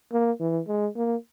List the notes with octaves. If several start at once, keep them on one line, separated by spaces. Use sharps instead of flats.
A#3
E3
G#3
A#3